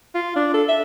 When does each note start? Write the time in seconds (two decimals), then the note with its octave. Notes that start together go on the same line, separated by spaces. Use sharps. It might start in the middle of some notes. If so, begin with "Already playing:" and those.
0.15 F4
0.36 D4
0.54 A4
0.69 E5